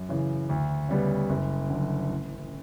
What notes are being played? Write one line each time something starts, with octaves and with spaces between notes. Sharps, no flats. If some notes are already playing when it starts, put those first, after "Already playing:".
Already playing: F#2
C#3 E3
D2
C#3 G3 B3
F#1
F#2 D3
A1